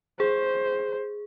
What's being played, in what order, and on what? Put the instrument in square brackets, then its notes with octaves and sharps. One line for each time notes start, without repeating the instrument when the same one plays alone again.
[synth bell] G#4 [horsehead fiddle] C5